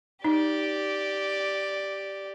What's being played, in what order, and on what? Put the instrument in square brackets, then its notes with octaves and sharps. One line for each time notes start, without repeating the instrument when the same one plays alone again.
[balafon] D#4 [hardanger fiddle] G4 D5